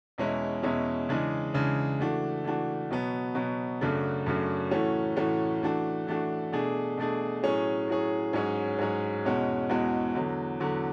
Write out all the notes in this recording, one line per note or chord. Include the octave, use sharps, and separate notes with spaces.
E2 B2 G#3 C#4 E4
E2 B2 G#3 C#4 E4
C#3 E3 G#3 D4 G#4
C#3 E3 G#3 D4 G#4
E3 A3 D4 F#4
E3 A3 D4 F#4
B2 F#3 B3
B2 F#3 B3
F#2 C#3 F#3 A3 D4
F#2 C#3 F#3 A3 D4
A2 E3 A3 C#4 F#4
A2 E3 A3 C#4 F#4
E3 A3 D4 F#4
E3 A3 D4 F#4
B2 A3 D4 G#4
B2 A3 D4 G#4
A2 F#3 C#4 G#4
A2 F#3 C#4 G#4
G#2 F#3 C#4 G#4
G#2 F#3 C#4 G#4
E2 B2 G#3 C#4 F#4
E2 B2 G#3 C#4 F#4
E2 D3 F#3
E2 D3 F#3